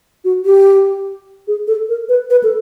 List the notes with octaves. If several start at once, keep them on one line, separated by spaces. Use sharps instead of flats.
F#4
G4
G#4
A4
A#4
B4
B4
A4